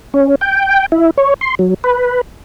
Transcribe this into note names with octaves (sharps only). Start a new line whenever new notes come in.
C#4
G5
E4
C#5
C6
F#3
B4